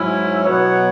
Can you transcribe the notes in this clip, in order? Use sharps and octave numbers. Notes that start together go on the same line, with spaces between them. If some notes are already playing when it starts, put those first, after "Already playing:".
Already playing: G#2 F#3 C#4 E4
B2 F#3 B3 F#4 C#5